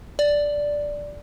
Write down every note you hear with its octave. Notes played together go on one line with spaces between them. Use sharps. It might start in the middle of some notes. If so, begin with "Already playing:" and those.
D5